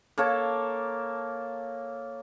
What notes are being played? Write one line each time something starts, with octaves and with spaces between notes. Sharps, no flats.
A#3 A4 C#5